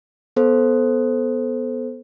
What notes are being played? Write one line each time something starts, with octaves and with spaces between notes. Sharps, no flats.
B3 A4 C5